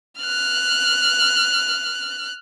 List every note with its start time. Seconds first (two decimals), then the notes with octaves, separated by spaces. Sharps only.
0.20 F6 F#6